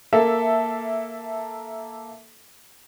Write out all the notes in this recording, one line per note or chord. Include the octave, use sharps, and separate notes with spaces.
A#3 A4 E5